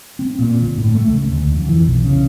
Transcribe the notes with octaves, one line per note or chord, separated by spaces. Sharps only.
C4
A#2
G1
A2
A3
C#2
D2
F2
E3
B1
C#3